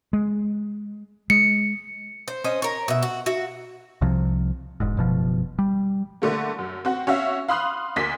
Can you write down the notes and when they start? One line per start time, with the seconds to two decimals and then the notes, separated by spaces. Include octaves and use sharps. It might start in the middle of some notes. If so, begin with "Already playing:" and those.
0.13 G#3
1.30 G#3 C#7
2.28 C5
2.44 C#4 C5 D#5
2.62 A#4 C#5
2.88 B2 E5
3.02 F#4
3.26 F#4 E5
4.01 C2 C3 F3
4.80 E1 G#2
4.97 F#1 B2 F3
5.59 G3
6.22 D3 A3 A#3
6.58 F#2
6.85 C4 F#4
7.07 C#4 F#4 E5 F5
7.48 F5 B5 C6 D#6 F6 F#6
7.96 D2 A#3 B6